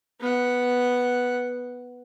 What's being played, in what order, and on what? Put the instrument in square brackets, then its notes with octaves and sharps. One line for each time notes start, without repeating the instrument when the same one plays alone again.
[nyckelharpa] B3 F#5